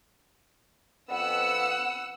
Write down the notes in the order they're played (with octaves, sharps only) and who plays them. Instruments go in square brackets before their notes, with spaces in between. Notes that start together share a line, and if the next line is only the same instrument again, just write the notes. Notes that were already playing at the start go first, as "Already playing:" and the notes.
[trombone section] F2 B3 [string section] F#5 E6